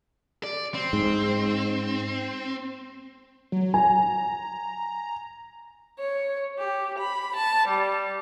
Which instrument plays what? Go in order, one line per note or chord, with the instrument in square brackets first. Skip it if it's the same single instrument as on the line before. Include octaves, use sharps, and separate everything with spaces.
[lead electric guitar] D5
C4
[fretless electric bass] G#2
[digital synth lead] F#3
[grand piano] G#5 [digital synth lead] A#5
[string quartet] C#5
G4
B5
A5
G3